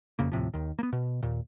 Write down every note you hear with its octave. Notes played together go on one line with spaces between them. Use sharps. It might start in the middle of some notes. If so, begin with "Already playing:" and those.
F#1 F2 C#3 A#3
D#2 A2 C3 F3
D#2 D#3
A#3 B3
B2
D#2 A#2